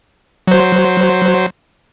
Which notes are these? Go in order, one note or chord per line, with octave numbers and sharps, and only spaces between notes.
F#3 C5